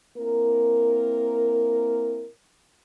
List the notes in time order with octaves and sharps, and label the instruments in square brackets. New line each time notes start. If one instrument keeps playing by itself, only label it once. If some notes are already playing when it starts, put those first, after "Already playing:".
[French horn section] A#3 C4 E4 A#4